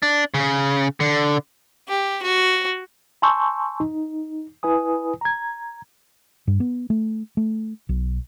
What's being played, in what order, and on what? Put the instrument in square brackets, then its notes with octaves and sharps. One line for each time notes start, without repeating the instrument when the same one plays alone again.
[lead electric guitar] D4
C#3
D3
[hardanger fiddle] G4
F#4
[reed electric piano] G#5 A5 C6 C#6 E6 G6
D#4
E4 B4 G#5 D#6
A#5 G#6
[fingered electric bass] G2
B3
A3
A3
B1